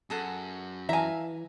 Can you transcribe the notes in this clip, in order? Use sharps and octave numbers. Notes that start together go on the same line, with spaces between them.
F#2 G#4 A4 F#5
E3 E5 F5 G#5 A#5